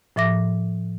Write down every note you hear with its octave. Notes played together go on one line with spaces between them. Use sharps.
A2 F3 E5 D6 A#6